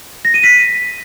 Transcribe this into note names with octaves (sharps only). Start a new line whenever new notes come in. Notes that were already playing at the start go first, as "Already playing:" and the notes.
A#6
D#7
B6